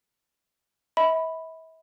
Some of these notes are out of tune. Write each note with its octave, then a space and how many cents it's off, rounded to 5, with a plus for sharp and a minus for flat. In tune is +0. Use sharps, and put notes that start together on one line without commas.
E5 -40 B5 +0